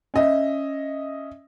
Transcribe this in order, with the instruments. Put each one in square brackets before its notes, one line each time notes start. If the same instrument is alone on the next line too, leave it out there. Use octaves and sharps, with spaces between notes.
[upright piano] C#4 D#5 E5